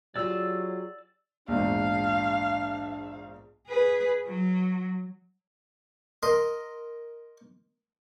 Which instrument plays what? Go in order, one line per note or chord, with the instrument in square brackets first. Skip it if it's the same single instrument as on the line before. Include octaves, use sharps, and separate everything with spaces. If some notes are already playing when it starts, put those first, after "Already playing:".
[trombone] F#3 [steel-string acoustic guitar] F4 G4 G#4 [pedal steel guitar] D5 E6
[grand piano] A#1 E2 G#2 [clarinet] D4 [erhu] F5
[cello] G#4 B4
F#3
[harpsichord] A#4 D#5 C6